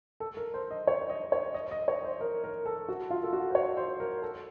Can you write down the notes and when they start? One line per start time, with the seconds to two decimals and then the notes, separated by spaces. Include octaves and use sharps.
0.20 A4
0.37 A#4
0.54 C5
0.71 D#5
0.87 C#5
1.10 D#5
1.32 C#5
1.54 D#5
1.71 D#5
1.88 C#5
2.05 C5
2.21 A#4
2.44 A#4
2.66 A4
2.88 F#4
3.10 F4
3.23 A4
3.33 F#4
3.50 C5
3.55 C#5
3.77 C5
4.00 A#4
4.22 A4